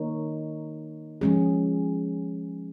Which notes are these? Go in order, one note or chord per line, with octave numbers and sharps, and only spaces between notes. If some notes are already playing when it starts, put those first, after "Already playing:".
Already playing: D#3 A#3 D#4 A#4 C#5
F3 G#3 C#4 G#4